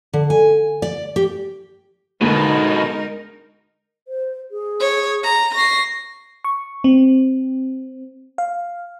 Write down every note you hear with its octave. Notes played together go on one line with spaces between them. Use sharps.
D3
G#5
D5
G4
G#2 B2 D3 G#3 D#4 A#4
C5
G#4
C#5
A#5
C#6 A#6 C7
C#6
C4
F5